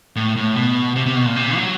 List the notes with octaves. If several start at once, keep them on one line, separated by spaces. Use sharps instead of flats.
A2
A2
B2
C3
C3
B2
A#2
C3
F#3